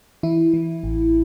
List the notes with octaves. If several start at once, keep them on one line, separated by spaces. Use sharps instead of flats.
E3 E4
E3
A1